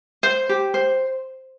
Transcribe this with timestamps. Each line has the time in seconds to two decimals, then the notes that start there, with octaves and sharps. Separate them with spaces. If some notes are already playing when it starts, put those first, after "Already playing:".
0.23 C5
0.49 G4
0.74 C5